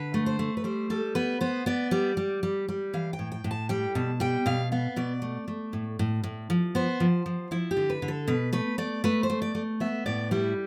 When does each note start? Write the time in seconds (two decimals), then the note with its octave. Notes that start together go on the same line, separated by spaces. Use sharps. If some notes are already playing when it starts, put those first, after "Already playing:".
Already playing: D3 B4
0.14 A3
0.26 C5
0.39 A3
0.57 B4
0.64 G3 C5
0.90 G3 A4
1.15 B3 B4
1.41 B3 C5
1.66 B3 D5
1.91 G3 D5
2.17 G3
2.43 G3
2.69 G3
2.94 E3 F5
3.13 G5
3.19 A2
3.32 G5
3.44 A2
3.51 A5
3.69 G3 G5
3.95 B2 A5
4.20 G3 G5
4.46 B2 F5
4.72 B3 F5
4.96 B2 D5
5.22 A3
5.48 A3
5.73 A2
5.99 A2
6.24 A2
6.50 F3
6.75 B3 C5
7.00 F3
7.26 F3
7.51 F3 E4
7.71 G4
7.77 D3
7.90 B4
8.02 D3
8.08 A4
8.28 B2 B4
8.53 A3 B4
8.78 A3 D5
9.04 A3 B4
9.23 C5
9.30 A3
9.42 D5
9.55 A3
9.80 B3 E5
10.06 A2 D5
10.31 G3 E4